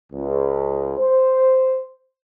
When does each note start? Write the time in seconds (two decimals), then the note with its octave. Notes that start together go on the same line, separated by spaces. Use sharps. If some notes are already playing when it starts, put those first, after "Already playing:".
0.13 C#2
0.98 C5